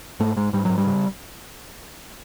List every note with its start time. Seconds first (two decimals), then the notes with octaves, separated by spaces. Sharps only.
0.20 G#2 A3
0.36 G#2 G#3
0.53 G#2 G3
0.65 G#2 F#3
0.78 G3
0.86 C#3